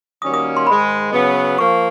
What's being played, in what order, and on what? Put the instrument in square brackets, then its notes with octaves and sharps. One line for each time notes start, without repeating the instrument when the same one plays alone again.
[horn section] D#3 G3 A#3 C#4 F#4 [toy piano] D#6
[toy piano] D#6
C6
[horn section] G#2 D#3 G#3 [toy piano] B5
[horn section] C#3 F#3 B3
[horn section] F3 A#3 [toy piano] C#6